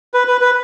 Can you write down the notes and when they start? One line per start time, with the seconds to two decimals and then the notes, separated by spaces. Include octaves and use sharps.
0.14 B4
0.27 B4
0.41 B4